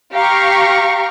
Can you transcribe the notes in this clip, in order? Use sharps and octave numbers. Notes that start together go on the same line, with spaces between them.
G4 F5 A#5 C#6